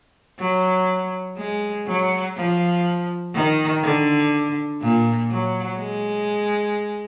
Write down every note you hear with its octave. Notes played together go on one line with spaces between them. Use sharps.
F#3
G#3
F#3
F3
D#3
D3
A#2
F#3
G#3